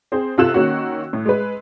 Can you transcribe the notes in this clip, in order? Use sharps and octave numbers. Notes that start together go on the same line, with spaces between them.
C4 G#4 C5
C3 F4 A4 E6 F#6 E7
D#3 A#3 C#4 F#4
A2
G#3 B4